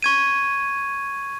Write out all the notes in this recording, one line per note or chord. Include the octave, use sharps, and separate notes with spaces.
C#6 G#6 D#7